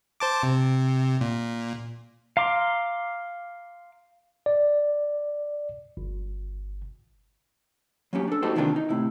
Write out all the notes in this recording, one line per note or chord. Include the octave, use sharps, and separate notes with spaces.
C5 A5 D6
C3
A#2
F5 A#5 C6 D6
D5
G1
F#3 A#3 C#4 G4
D4 A4
A#3 D#4 F#4 G4 A4 C5
C3 D#3 E3 A#3 D4 F4
D#4
A2 C3 E4